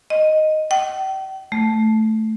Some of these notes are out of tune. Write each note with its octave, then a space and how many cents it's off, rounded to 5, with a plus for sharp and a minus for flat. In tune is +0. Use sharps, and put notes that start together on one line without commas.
D#5 +0
G5 -40
A3 -5